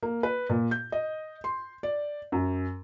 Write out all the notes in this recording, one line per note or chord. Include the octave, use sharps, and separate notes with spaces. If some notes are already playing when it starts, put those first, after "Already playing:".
A#3
B4
A#2
G6
D#5
C6
D5
F#2